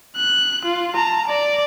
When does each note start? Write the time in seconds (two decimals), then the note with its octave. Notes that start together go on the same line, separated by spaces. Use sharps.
0.16 F#6
0.65 F4
0.95 A5 A#5
1.27 D5